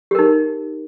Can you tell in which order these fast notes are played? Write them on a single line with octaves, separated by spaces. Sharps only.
G4 A#4 D#4